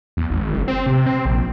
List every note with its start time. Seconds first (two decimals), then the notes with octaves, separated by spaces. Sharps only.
0.17 E2
0.30 G#1
0.53 F#1
0.68 C4
0.86 C3
1.06 C4
1.25 A#1